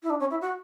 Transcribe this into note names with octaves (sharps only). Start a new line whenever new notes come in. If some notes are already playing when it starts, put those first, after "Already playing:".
E4
D4
C#4
E4
F#4